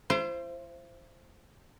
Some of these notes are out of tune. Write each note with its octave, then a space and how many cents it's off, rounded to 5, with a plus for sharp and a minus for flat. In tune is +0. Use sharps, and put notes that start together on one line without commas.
E4 +45 C5 +0